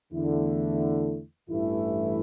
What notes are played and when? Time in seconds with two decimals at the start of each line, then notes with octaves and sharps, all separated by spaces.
0.13 E2 D3 A3 E4
1.49 A1 G2 E3 A3 E4